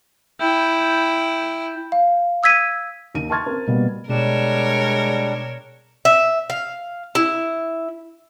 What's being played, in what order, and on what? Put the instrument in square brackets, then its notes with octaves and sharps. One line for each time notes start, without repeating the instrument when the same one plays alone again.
[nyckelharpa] E4 G5
[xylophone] F5
D#6 E6 G#6 B6 D#7
[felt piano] D#2 D#4 D#7
A5 C6 C#6 F6 G#6 A6
C4 A#4
B2 G3 A#3 B3
[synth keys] B2 E7 [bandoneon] G3 D4 [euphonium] G#3 [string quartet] A#4 C#5
[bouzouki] E5
F5
E4